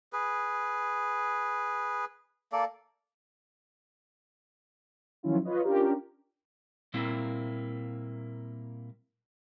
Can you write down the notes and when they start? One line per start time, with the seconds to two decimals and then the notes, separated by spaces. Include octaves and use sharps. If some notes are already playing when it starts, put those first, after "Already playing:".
0.13 G#4 B4
2.53 A#3 A4 D5
5.23 D#3 F3 F#3 C#4 E4 F4
5.45 F4 B4 C#5 D#5
5.64 C#4 D4 F4 G4 A#4
6.94 A#2 G3 A#3 C4 E4